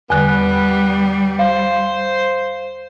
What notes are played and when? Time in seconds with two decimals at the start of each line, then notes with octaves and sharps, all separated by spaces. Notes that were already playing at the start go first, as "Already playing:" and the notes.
0.10 E2 D3 G3 B3
1.39 C5 F5